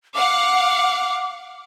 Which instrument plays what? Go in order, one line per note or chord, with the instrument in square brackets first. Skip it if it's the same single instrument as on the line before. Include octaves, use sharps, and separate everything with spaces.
[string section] F5 F#5 [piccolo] D6